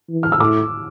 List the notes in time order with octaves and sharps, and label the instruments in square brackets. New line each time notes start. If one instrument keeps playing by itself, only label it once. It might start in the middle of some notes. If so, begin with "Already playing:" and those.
[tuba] E3
[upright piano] F6
E6
[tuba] A2 [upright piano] D6